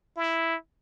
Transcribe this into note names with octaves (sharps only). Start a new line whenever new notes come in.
E4